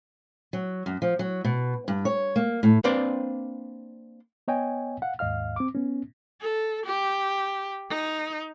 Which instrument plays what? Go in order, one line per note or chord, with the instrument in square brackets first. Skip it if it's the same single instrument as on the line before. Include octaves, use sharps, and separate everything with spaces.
[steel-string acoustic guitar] F#3
F#2
F3
F#3
B2
G2
C#5
A#3
A2
[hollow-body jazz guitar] A#3 C4 D4 B4 C5 D5
[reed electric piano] B3 C#5 D#5 G5 G#5
F5 F#5
D#2 G#2 D#5 F5 F6
C4 D6
B3 C#4
[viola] A4
G4
D#4